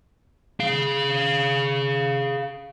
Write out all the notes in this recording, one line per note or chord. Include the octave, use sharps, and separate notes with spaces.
G#4 F5